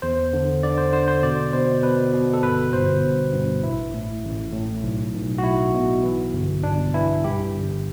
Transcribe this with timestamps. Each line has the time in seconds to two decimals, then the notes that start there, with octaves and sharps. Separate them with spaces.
0.02 E2 C5
0.33 D3
0.63 D3 D5
0.78 C5
0.92 D3 C5
1.08 C5
1.23 B2 D5
1.53 B2 C5
1.83 B2 B4
2.13 B2
2.33 A4
2.42 G1 B4
2.73 G1 C5
3.04 G2
3.33 G2
3.63 A1 E4
3.94 A2
4.24 A1
4.53 A2
4.83 B1
5.13 B1
5.38 F#4
5.44 B1 E4
5.74 B2
6.03 E3
6.33 G1
6.63 G1 D4
6.94 E3 E4
7.24 G2 G4
7.54 G1